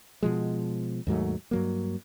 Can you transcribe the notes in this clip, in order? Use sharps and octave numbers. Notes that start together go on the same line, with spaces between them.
B2 F3 G#3
D#2 G#2 F#3 A3
G2 F#3 A#3